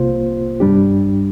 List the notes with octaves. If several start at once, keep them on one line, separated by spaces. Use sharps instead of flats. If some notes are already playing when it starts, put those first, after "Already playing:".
Already playing: C2 C3 A#3 F4 C5
G2 G3 D4 G4